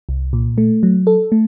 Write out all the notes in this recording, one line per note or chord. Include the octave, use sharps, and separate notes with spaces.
C2
A#2
A3
F#3
A4
A3